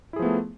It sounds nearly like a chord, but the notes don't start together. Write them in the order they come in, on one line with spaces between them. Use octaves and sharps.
E4 G#4 F3 B3 A3